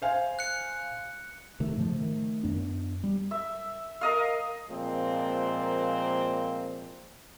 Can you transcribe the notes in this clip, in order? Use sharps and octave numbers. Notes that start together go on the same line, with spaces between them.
C5 F5 G#5
F#6 C#7
C3 D#3 A3
G#2 C#3 F3 A3
D#3 A3
F#2 B3 D4
G3
E5
A#4 D#5 F5
A#2 F3 G#3 A#3 C4